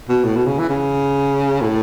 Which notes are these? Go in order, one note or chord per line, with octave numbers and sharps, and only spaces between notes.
B2
A2
B2
C#3
E3
C#3
A2